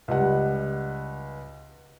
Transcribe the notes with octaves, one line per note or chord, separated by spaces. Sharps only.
C#2 G3 F#5